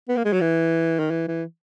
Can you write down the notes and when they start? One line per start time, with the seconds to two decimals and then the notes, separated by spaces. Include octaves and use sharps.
0.09 B3
0.17 A#3
0.25 G#3
0.33 F#3
0.41 E3
0.99 D#3
1.11 E3
1.28 E3